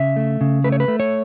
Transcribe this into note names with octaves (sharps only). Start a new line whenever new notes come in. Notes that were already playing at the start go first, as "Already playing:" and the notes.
Already playing: C#3 E5
A3
C#3
A3 B4
C#5
B4
A3
C#5